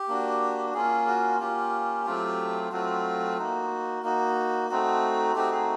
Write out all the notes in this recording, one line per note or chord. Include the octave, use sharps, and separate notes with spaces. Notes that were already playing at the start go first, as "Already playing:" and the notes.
Already playing: G4
A#3 D4 F#4
A#3 C#4 F4 G#4
F#4
A#3 C#4 F4 G4
F#3 A3 C4 F4
F#3 A3 C4 F4 F#4
A#3 D#4 F#4
A#3 D#4 F#4
A3 C4 D#4 F#4
A3 C4 D#4 F#4 G4
G#4